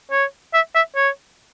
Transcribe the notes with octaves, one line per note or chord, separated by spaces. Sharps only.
C#5
E5
E5
C#5